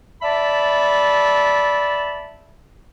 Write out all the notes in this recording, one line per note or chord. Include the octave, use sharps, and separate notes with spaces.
D5 E5 A5 B5